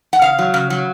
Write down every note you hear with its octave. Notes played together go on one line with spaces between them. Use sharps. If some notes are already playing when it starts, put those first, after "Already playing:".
F#5
C#3 F5
F#3
C#3
F#3